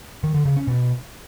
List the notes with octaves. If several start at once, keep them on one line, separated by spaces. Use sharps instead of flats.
D#3
D3
C#3
C#4
B2